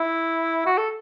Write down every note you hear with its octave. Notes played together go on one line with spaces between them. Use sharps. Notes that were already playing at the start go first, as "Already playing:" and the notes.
Already playing: E4
F#4
A4